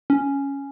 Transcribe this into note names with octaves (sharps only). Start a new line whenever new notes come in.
C#4